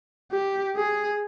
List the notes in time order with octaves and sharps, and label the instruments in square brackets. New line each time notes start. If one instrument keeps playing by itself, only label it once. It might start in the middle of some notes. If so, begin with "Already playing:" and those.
[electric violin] G4
G#4